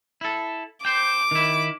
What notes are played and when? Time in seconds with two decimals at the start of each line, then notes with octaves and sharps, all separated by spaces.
0.21 E4 A4
0.85 C5 G5 D6
1.31 D#3 E4